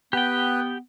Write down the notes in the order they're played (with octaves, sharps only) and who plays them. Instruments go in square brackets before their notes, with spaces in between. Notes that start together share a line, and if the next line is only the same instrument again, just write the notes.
[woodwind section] B3 [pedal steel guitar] G4 G5 [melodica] B4